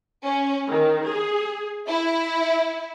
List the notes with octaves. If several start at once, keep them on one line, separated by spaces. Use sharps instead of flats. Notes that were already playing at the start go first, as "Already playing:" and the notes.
C#4
D#3
G#4
E4